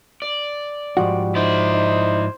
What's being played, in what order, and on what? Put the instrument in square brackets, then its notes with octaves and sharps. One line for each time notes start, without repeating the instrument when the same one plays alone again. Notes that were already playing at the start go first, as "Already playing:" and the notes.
[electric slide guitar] D5
[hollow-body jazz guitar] G#2 F3 F#4 [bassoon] G3
[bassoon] D#4 [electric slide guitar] E4 D5 [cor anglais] C5
[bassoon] D#4